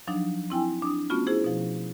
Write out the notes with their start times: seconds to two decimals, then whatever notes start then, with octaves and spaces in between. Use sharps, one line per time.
0.07 F3 F#3 D4 D#4
0.50 C4 E4 G5 G#5
0.82 D4 D#6
1.10 A3 B3 C#4 F4 F#4
1.27 E4 G#4 C5
1.44 B2 F3